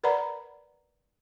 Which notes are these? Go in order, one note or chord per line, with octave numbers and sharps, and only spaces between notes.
A#4 B4 D5 F#5 A#5 B5